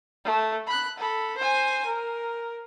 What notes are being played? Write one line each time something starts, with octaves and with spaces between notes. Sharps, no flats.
A3
B5 F#6
A4 B5
C5 G#5
A#4